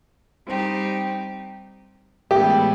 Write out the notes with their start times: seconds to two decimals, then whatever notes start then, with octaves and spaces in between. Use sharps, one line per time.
0.46 G3 C4 D#4 G4
2.31 A2 E3 G#3 B3 E4 G4